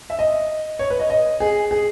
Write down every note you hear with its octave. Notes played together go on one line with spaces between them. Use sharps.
E5
D#5
C#5
B4
D#5
D#5
G#4
G#4